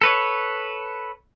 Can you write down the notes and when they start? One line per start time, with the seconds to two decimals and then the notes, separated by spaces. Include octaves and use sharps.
0.01 A4 B4 C#5